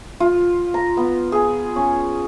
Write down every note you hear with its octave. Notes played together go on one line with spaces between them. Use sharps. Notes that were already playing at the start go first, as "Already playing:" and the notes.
F4
A#5
B3
G#4
C#4